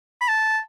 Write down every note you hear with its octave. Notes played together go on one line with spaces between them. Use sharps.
B5
A5